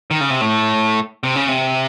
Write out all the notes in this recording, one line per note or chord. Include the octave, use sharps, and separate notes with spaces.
D#3
C#3
C3
A2
C3
C#3
C3